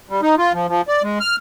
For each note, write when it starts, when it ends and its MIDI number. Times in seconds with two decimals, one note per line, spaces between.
0.09 0.21 55
0.22 0.35 63
0.38 0.53 65
0.53 0.67 53
0.68 0.82 53
0.88 1.02 74
1.03 1.19 56
1.20 1.36 89